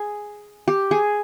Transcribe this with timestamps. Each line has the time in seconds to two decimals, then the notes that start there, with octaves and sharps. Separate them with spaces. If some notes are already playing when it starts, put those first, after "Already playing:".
Already playing: G#4
0.68 G4
0.91 G#4